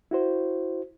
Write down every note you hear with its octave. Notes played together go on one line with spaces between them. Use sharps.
E4 F#4 C5